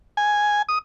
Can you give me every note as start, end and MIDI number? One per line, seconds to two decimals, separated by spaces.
0.17 0.62 80
0.69 0.78 87